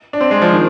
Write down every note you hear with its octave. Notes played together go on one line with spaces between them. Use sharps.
D4
C4
G#3
F3
D#3